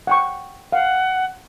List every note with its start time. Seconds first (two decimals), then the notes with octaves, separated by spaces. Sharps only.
0.07 F#5 G5 C#6
0.72 F5 F#5